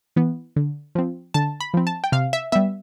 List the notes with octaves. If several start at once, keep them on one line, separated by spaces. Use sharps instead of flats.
E3 B3
D3
F3 C4
D3 A5
B5
F3 C4
A5
G5
C3 F5
E5
G3 B3 E5